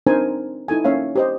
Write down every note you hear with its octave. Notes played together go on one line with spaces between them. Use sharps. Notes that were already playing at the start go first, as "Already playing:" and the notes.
C4 D4 D#4 A#4 C5 G#5
D#4 E4 A4 G#5
A#3 C#4 C#5 E5 F5
G4 C5 D#5